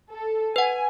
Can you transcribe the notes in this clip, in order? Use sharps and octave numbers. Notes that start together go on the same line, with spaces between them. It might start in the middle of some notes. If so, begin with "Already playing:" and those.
A4
B4 F#5 G#5